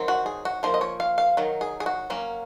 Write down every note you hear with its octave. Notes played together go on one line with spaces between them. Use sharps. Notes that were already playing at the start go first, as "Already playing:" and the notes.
Already playing: D#3 F#3 C4
F#4
G#4
F#4
F3 A#3 F4 C5
D#5
C#5
F5
F5
D#3 F#3
G#4
G#4
F#4
F#3 A#3 C#4